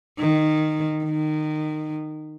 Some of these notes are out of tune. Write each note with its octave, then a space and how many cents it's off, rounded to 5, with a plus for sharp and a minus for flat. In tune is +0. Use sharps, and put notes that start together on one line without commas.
D#3 -10
D#3 -20